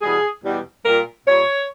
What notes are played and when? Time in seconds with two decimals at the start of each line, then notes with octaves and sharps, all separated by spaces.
0.02 E2 B2 G3 G#4
0.43 E2 B2 G3
0.84 A#2 G3 A#4
1.26 A#2 G3 C#5